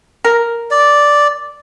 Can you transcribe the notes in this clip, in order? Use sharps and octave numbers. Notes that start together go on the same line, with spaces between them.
A#4
D5